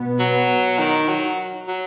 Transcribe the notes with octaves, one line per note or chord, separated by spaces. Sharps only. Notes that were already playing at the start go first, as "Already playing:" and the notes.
Already playing: B2 B3
F#3
D#3
F#3
F#3